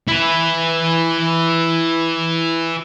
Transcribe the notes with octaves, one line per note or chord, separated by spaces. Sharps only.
E4 B4